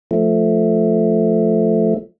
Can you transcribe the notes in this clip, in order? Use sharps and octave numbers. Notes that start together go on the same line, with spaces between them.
F3 A3